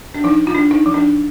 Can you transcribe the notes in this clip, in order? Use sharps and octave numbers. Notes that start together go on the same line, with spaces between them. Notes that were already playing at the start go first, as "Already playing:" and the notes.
D4
F3 D#4
F4
D4
D#4
F3
D4